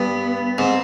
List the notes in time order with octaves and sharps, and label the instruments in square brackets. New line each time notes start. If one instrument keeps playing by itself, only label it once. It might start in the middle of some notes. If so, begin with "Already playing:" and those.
Already playing: [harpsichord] G2 [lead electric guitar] B3
[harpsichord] G#2 [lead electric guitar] C4